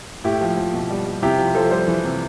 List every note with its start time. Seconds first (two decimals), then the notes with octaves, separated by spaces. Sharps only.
0.24 A2 E4 G4
0.41 F3
0.57 F3
0.74 B2
0.90 G3
1.06 G3
1.22 C3 E4 G4
1.38 F3
1.55 F3 A4 C5
1.71 G3 A4 C5
1.88 E3
2.04 C3